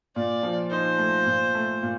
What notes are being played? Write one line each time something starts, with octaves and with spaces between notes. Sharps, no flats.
A#2 D5
F3
D#4 C5
A3
A#2
A3
A#2